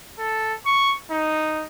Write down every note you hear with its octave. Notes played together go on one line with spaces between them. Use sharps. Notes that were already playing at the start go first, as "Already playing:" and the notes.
A4
C#6
D#4